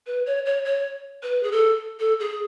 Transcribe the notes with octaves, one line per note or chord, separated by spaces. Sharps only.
B4
C#5
C#5
C#5
B4
G#4
A4
A4
G#4